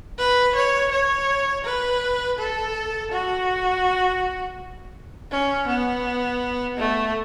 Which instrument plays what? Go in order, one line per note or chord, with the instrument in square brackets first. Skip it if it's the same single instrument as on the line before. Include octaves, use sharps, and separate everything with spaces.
[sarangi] B4
C#5
C#5
B4
A4
F#4
C#4
B3
A3